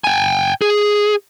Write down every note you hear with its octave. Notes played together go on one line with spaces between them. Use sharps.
G5 G#5
G#4